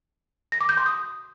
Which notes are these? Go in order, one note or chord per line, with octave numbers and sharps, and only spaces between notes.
A#6
D6
G6
C6
D#6